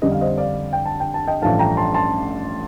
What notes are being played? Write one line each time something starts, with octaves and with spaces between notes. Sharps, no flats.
F2 D3 G3 D#5
F5
C5 D#5
D5 F5
G5
A5
G5
A5
D#5 G5
A1 G2 F3 A3 F5 A5
G5 A#5
A5 C6
A5 C6